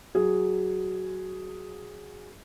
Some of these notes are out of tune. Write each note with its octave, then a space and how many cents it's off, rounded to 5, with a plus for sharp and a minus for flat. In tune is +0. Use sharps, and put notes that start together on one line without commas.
F#3 +10 G#4 +0